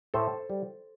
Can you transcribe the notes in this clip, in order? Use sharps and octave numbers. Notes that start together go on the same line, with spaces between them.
A2 A4 C5
G3